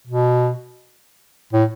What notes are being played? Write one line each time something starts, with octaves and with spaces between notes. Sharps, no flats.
B2
A2